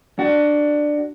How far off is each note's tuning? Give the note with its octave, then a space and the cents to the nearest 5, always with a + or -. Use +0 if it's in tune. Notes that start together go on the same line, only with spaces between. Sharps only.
D4 +10 F#4 +20